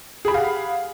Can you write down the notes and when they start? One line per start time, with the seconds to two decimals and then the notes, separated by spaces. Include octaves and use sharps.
0.25 G#4
0.28 B5
0.31 G4
0.34 F5
0.37 F#5